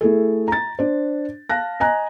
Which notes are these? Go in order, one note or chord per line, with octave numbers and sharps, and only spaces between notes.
A3 E4 G#4 A4
A#5 A6
D4 C5
F5 A5 F#6 A#6
D#5 G#5 A#5 F#6